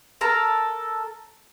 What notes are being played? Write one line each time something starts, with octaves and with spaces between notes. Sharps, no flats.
A4 A#4 A#5